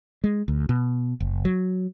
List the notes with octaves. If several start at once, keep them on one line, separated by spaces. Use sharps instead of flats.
G#3
D2
B2
F#1
F#3